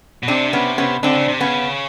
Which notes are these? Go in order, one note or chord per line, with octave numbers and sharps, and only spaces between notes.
B2
C3 C4 D4
B3 C#4
B3 C#4
D3 C4 D4
C#3
C3
C#3 B3 C#4